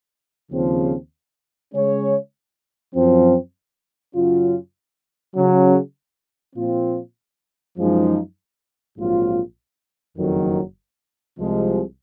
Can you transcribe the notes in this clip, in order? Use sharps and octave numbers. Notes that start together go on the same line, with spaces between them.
D#2 C#3 F3 C4
C#3 G#3 C#4 G#4 C#5
F#2 F3 C4
F#2 C#3 F#3 C#4 F4
C#3 F#3 C#4
A#2 F3 C4 F4
F#2 F3 G#3 D#4
A#1 G#2 F#3 C4 F4
F#1 F2 D#3 F#3
C2 C3 F3 G#3